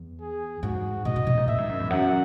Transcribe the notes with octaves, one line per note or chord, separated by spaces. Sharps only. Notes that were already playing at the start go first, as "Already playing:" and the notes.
Already playing: E2
G#4
G#2 F#4
B2 D#5
B2
B2
G#2
A#2 E5
G#2
F#2
E2
F#2 F#5